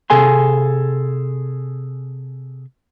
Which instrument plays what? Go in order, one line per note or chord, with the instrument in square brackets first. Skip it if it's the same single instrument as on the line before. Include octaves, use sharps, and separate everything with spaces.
[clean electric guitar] C3 G#4 A4 G#5 C6